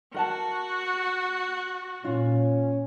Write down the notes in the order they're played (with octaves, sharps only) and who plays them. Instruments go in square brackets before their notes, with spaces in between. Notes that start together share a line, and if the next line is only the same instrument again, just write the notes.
[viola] F#4 [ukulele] A#4 F#5 A5
[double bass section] A#2 [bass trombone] C#4 [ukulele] F4